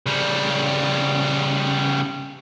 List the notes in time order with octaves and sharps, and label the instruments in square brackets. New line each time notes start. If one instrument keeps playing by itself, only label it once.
[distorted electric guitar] C#3 G3